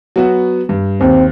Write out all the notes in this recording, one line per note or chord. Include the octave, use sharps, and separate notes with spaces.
F#3 B3 F#4
G2
D#2 C4